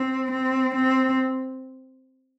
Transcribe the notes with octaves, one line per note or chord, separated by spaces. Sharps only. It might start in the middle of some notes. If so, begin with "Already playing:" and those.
Already playing: C4
C4
C4